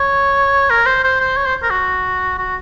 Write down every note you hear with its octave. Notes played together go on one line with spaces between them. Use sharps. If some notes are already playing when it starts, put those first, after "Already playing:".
Already playing: C#5
A#4
C5
C5
C5
C#5
C5
A#4
F#4
F#4